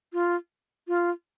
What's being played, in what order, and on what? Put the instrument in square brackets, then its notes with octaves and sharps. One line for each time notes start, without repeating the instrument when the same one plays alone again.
[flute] F4
F4